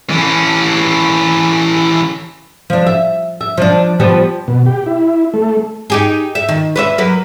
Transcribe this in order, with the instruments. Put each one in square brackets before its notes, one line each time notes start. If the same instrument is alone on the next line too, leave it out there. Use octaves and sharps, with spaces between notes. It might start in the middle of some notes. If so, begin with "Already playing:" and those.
[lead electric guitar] E3 C#4
[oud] F3 D4
E5
E5
F3 D4
F3 G3 B3
[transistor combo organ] B2
G4
E4
A3
[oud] D#4 G4 G#4
E5
D#3
B4 C#5 E5
F#3 A#3 B4